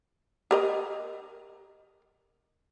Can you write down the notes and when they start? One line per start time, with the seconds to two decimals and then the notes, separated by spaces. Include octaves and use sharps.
0.51 G4 A#4 D#5